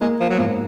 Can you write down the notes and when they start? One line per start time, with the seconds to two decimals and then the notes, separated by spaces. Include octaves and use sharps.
0.01 G#3 A#3
0.20 F3
0.30 F#3
0.38 G#2 F3